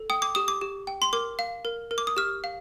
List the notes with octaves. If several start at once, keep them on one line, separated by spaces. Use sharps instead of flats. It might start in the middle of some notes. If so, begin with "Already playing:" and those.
Already playing: A4
G5 D#6
D6
G4 D#6
D6
G4
G5
C6
A#4 D6
F5
A#4
A#4
D6
D#6
G4 F6
F5